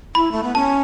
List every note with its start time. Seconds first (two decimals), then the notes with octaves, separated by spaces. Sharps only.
0.15 E4 B5
0.32 A3
0.43 B3
0.55 C#4 A5